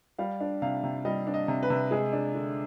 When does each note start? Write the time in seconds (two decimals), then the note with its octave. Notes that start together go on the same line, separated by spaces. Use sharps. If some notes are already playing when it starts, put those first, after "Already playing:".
0.19 G3 F5
0.40 D4
0.62 C3 F5
0.83 C3
1.05 G3 D#5
1.27 D4
1.34 D#5
1.48 C3
1.63 B4
1.70 C3
1.91 G#3 G#4
2.13 D4
2.35 D3